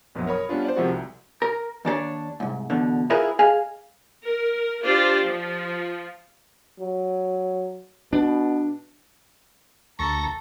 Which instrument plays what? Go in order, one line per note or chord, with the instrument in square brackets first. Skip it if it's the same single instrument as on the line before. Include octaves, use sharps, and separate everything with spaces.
[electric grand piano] A#1 F#2 B2 F3 F#3
A#4 C#5 B5 D#6
G3 B3 C#4 D4 F4
C5 D5
C3 D#3 F3 G#3 E4 F#4
C2
[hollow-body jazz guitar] A#4
D#2 D4 A4 C#5
C2 G#2
E2 B2 D3
E4 F4 G#4 A#4 B4
G#4 D#5 F5 G#5
[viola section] A#4
D4 F4 G4 C5 D5
F3
[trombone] F#3
[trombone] B2 [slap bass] D4
[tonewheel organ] D2 A#6 [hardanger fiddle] A4 [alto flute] A#5 [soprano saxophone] C#6